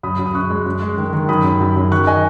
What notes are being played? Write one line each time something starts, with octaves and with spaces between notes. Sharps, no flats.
F#2 B5 D#6
F#2
D#6
F#2 C#6 F#6
G#3
F#2
G#3
D#3
D#3
F#2 B5 D#6
F#2
F#2
F#2
D#3 C#6 F#6
D#5 G#5